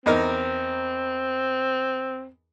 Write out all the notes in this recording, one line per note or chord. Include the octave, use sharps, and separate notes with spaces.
E2 C4 D#4 A#4